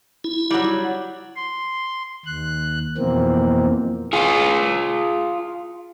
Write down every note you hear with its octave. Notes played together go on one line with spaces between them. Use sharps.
E4
F#3 G3
C6
D#2 F#6
F2 B2 E3 A#3 C4
F4 G#4